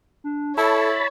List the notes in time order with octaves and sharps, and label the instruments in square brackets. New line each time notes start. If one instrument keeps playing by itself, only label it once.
[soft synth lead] D4
[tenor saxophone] E4 [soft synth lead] A4 [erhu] C#5 [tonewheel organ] A5 B5